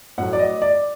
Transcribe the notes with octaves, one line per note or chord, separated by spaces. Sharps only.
A2 F#3 A3 F#5
D5
D#5
D5